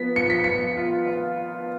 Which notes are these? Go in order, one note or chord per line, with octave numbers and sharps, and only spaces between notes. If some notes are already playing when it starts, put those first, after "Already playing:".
Already playing: F3 B3 B6
F3 C#7
B6
F3 C#7
F4
F4